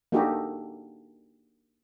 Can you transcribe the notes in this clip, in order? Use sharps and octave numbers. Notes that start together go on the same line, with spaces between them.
A#3 D4 D#4 F#4 G4 A4